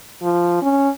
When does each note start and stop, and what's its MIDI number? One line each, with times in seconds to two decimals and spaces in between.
0.23 0.59 53
0.62 0.89 61